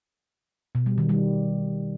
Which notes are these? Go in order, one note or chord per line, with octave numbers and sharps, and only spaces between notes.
B2
G3
D#3
G3